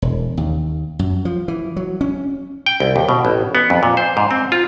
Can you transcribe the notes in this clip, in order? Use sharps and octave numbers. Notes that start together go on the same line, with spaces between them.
E1
D#2
F#2
F3
E3
F#3
C#4
G5
C2
D#2
B2
A1
B3
F2
A#2
C5
G#2
C4
F4